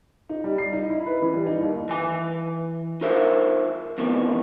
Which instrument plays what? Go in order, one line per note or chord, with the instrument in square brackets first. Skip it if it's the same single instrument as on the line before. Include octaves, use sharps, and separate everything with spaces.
[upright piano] D#4
G3
C7
D#4
E4
B4
E3
G3
D#4
D#2
[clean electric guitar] E3 G#5
D#4 F4 A#4 C5 E5
F2 B2 D#3 E3